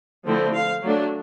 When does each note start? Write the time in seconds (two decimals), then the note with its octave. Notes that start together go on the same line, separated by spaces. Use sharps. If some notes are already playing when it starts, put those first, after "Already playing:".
0.26 D3 F3 A3 C4 E4
0.54 F5
0.82 F#3 A3 D4